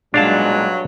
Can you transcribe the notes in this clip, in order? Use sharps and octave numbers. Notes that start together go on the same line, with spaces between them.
B1 G2 A#2 F#3 G#3 D4 F5 A5